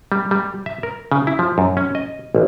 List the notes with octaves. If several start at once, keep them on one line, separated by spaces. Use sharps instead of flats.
G3
G3
E5
A#4
C#3
E4
F3
F#2
C#4
D#5
A1